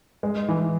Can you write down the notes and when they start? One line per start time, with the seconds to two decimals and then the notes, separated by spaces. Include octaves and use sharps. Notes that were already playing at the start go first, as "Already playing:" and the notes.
0.23 G#3
0.48 E3